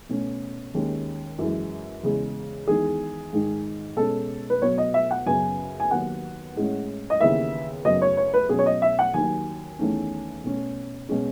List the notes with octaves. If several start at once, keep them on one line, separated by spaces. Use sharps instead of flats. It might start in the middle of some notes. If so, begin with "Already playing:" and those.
B2 A3 C#4
D#2 D#3 G#3 C#4
F#2 E3 G#3
E2 C#3 G#3
E2 D#3 G#3 G#4
G#2 D#3 G#3
B2 G#3 C#4 A4
B4
B2 F#3 B3 C#5
D#5
E5
F#5
F#2 C#3 F#3 B3 G#5
G#5
D#2 D#3 F#3 B3 F#5
A2 G#3 C#4
D#5
D#2 C#3 E3 B3 E5
F#2 C#3 F#3 B3 D#5
C#5
C#5
B4
B2 F#3 C#4 G#4
C#5
D#5
E5
F#5
D#2 D#3 F#3 G#5
E2 D#3 A3 C#4
B2 A3 C#4
B2 G#3 C#4